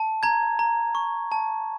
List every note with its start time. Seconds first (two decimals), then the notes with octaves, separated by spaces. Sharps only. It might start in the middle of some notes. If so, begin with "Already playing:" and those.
Already playing: A5
0.23 A#5 G#6
0.59 A#5
0.95 C#6
1.32 A5